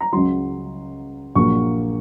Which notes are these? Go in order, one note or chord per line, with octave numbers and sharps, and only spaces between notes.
A#5
C#2 C#3 F#3 C6
A#1 A#2 F#3 A#3 C#6